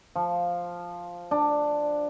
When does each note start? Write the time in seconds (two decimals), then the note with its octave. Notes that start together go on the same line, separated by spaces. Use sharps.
0.16 F3
1.31 D4